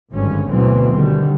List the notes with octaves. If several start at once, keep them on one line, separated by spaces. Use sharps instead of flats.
G#1 G2 D3 C#4
D2 B2 E3 F#3 C4
D3 D#3 G3